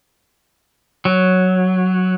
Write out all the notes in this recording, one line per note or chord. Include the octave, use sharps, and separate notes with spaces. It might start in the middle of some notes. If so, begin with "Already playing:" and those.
F#3